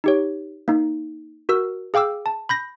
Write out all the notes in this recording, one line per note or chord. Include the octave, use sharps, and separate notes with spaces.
D#4 G4 C#5
A#3 D#4
F#4 A#4 E6
G#4 F5 G5 D6 E6
A5
B5 G6 A#6